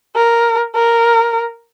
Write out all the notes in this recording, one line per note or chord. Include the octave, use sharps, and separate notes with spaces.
A#4
A#4